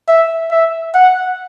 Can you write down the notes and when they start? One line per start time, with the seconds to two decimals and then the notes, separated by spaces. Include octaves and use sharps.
0.08 E5
0.51 E5
0.94 F#5